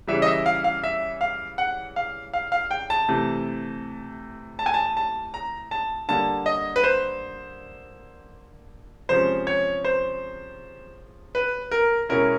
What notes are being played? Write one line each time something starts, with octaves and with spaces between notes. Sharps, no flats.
C#3 E3 G3 E5
D#5
E5
F5
F5
E5
F5
F#5
F5
F5
F5
G5
A5
C3 E3 A3
A5
G#5
A5
A5
A#5
A5
D3 G3 A#3 A5
D#5
B4
C5
C3 F3 G#3 C#4 C5
C#5
C5
B4
A#4
B2 G#3 C#4 E4 A#4